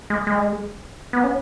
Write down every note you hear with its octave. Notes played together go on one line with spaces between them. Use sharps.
G#3
G#3
B3
C#4